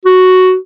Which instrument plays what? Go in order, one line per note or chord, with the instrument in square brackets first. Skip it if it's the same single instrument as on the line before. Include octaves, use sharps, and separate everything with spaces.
[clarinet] F#4